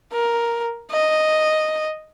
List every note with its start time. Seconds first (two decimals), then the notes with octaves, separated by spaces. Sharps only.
0.12 A#4
0.91 D#5